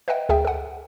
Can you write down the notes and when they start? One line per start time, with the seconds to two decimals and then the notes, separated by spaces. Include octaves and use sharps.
0.08 B4 D#5 E5 F#5 G5
0.29 D2 G#4 E5 G5
0.45 A4 F#5